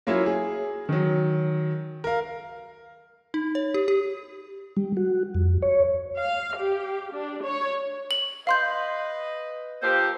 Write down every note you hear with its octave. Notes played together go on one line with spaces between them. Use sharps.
F#3 A#3 C#4 E4 F4
G#4
D#3 F#3
A#4 F5
D#4
C#5
G4
G4
G3
F#4
F2
C#5
F5
G4
D4
C#5
F#7
B4 D#5 F5 C6 G6
F3 A#3 G4 A4 C5